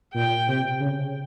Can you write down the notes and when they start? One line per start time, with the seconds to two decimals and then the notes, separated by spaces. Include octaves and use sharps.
0.14 A#2 G5
0.48 C3
0.80 C#3